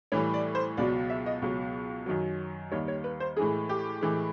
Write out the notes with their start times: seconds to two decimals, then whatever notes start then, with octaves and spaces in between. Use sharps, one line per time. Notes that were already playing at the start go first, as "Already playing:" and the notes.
0.12 A2 E3 G3 C#5
0.34 D5
0.55 C5
0.77 C#2 B2 F#3 D5
1.10 E5
1.26 D#5
1.42 C#2 B2 F#3
2.06 F#2 D#3 F#3
2.71 D#2 D#3 G3 C#5
2.88 C#5
3.04 B4
3.20 C5
3.37 A2 E3 G#3 G#4
3.69 G4
4.01 A2 E3 G#3